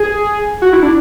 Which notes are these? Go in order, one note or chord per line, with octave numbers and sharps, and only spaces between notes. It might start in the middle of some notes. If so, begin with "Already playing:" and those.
Already playing: G#4
F#4
E4
D4